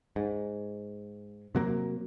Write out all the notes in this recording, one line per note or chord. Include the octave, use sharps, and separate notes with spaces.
G#2
C3 F#3 A#3